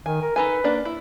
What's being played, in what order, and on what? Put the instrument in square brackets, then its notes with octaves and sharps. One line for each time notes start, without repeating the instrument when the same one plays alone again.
[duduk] D#3 [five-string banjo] G#5
[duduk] A#4
[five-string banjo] D#4 A4 G#5 [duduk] B4
[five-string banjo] A#3 D4 D5
E4